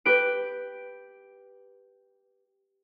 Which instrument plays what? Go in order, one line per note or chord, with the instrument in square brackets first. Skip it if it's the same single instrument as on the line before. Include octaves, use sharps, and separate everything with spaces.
[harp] G4 B4 D7